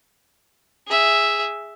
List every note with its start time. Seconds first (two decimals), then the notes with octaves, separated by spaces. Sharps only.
0.88 G#4 E5